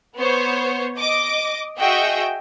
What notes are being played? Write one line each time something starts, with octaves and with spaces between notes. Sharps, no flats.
B3 C5 C#5
D#5 D6
F#4 G#4 D#5 E5 G5